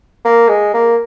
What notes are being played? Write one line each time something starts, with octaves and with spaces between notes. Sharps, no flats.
A#3
G#3
A#3